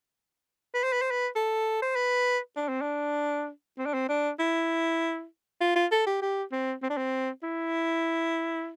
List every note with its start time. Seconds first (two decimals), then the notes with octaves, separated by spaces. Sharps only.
0.74 B4
0.83 C5
0.93 B4
1.02 C5
1.11 B4
1.35 A4
1.82 C5
1.96 B4
2.56 D4
2.69 C4
2.81 D4
3.78 C4
3.86 D4
3.94 C4
4.09 D4
4.39 E4
5.61 F4
5.76 F4
5.92 A4
6.06 G4
6.22 G4
6.52 C4
6.83 C4
6.90 D4
6.97 C4
7.43 E4